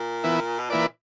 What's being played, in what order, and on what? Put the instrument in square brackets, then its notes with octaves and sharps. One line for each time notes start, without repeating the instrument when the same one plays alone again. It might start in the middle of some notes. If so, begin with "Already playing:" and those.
Already playing: [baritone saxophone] A#2
[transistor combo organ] E3 B3 E4
[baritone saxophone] B2
[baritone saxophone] A#2 [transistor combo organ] E3 A#3 E4 B4 D5